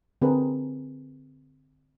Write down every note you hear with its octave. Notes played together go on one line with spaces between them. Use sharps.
D3 C4 G#4 A#4 B4